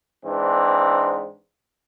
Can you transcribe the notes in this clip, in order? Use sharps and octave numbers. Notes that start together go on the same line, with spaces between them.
G#2 E3 C4 D4